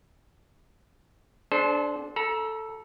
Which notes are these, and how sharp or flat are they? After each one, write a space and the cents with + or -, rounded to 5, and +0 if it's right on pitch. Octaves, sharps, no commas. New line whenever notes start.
D4 -5 A4 -45 C5 -5
A4 +0 A#5 +35